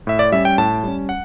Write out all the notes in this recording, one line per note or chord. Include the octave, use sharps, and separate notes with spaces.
A2 E5
D5
G3 C#4 E5
G5
A2 A5
G3 C#4
F#5